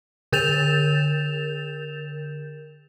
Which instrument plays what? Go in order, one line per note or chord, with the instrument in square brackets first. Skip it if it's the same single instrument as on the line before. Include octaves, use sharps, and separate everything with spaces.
[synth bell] D3 A#4 G6 A6 E7 F7